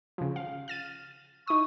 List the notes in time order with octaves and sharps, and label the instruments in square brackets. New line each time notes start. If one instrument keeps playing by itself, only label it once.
[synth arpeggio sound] C#3 F3
F5
F6 A6 D#7
[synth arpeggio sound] D#4 D#6 [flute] C#6